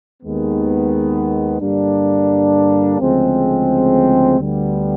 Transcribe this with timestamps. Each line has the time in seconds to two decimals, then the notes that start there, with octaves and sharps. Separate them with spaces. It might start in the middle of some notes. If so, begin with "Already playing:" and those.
0.23 D#2 D#3 G#3 B3
1.61 G2 D3 G3 A#3 D4
3.00 D2 C#3 F3 G#3 C4
4.39 D2 D3 G3 B3